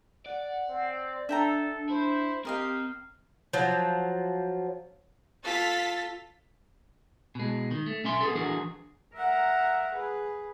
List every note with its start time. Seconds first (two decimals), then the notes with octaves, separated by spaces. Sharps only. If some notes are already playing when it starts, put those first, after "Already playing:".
0.26 D5 F#5
0.68 C4
1.29 D4 A4 E5 G5 A#5
1.90 E4 C5
2.45 C4 G4 A#4 D#5 F5
3.53 F3 F#3
5.44 F4 A4 A6 B6
7.35 B2 G#3
7.71 D#3
7.86 A3
8.04 B1 C#4 E5 C6
8.21 B3 G#4 A4
8.35 E3 D4 F#4 G#4 A#4
9.14 A#4 E5 F#5 A#5
9.94 G#4 B4